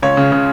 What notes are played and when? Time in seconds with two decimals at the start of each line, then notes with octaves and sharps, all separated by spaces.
0.02 C#2 C#5
0.17 C#3
0.32 C#3